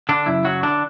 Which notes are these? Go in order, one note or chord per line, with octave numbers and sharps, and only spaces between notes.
D3 D4
F#2 C#3 E4
F#3 F#4
D3 D4